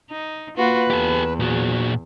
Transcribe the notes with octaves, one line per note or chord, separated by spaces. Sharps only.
D#4
A#3 F4 F#4 B4
E2 G4 A4
A#2 F#4 G#4